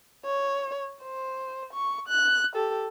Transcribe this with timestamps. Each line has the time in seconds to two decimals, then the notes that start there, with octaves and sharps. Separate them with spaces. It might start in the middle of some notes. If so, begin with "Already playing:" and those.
0.25 C#5
1.02 C5
1.73 C#6
2.08 F#6
2.55 G4 A4